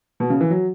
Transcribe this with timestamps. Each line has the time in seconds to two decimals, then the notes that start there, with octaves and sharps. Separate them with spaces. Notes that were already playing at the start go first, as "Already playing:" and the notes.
0.20 B2
0.30 C#3
0.41 E3
0.50 F#3